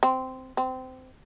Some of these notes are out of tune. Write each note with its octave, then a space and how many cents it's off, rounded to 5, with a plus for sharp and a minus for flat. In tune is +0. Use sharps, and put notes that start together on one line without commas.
C4 -10
C4 -20